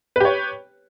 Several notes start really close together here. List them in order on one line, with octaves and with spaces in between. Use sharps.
B4 G4 C#5